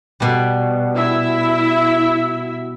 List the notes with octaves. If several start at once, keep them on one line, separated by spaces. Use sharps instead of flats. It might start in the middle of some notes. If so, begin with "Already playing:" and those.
B2 G3
E4 E5